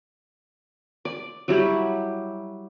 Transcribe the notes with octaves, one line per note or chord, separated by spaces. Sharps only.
D5
F#3 G3 E4 G4